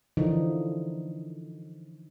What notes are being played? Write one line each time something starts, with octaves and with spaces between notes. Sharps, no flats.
D3 E3 F3 D#4